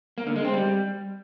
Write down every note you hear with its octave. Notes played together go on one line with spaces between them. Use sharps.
A#3
D3
G#3
C4
G3